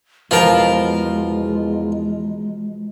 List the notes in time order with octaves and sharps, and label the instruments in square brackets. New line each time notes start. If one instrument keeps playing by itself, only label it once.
[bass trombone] E2 [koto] B2 F3 [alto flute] G#3 [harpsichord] F4 A#4